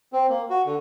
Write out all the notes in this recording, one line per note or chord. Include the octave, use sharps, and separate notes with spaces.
C4
A#3
F#4
D3